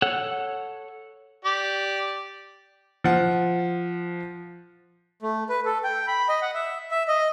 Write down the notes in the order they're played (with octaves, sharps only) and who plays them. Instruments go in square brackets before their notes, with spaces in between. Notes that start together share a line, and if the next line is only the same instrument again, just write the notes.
[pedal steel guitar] A4 C#5 F#5 F#6
[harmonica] G4 D5
[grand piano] F3 F#5
[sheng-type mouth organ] A3
B4
A4
G5
B5
D#5
F#5
E5
E5
D#5